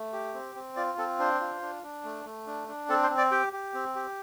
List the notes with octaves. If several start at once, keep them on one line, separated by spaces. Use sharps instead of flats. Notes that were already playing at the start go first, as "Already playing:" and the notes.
Already playing: A3
G4
C4
C4
F4 D5
C4 A4
D4 C5
F4
D4
D4
A3
A3
D4
D4
C4 A4
C5
C4
D5
G4 G5
G4
C4
G4